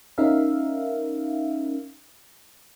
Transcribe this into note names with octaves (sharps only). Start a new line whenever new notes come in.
C#4 D#4 A#4 E5 F5